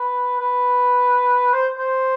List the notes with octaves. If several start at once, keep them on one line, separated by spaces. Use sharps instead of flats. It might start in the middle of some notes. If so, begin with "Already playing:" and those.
Already playing: B4
B4
C5
C5